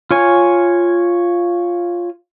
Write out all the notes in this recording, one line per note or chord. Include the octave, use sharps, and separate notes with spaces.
F4 C#5 G#5